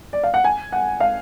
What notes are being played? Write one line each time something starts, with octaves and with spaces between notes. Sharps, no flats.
D5
F5
F#5
G#5
F#5
F5